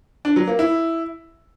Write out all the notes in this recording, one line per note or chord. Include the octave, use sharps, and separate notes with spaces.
D4
F#3
A#3
E4